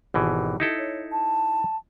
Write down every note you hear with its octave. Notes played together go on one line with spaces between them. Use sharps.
G#1 B2 E3 G4
D#4 E4 A4
C#5
A5